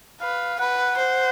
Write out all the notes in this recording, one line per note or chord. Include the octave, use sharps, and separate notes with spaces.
B4 F5
B4 F#5
C5